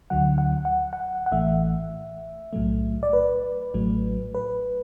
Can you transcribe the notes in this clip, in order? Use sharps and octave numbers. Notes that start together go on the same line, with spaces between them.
D2 D3 F#3 F#5
F#5
F#5
F#5
F#5
A1 A2 E3 A3 E5
B1 A2 F#3 A3
D5
B4
A1 A2 F#3 A3
B4